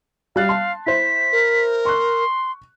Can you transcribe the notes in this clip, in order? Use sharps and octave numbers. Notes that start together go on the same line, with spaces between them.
G3 F5 F#6 A6
A5 C6
E4 C5 B6
A#4
C6 C#6 F#6